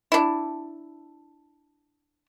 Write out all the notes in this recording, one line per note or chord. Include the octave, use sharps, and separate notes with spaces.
D4 E4